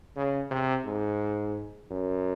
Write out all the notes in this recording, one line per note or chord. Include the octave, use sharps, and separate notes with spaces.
C#3
C3
G#2
F#2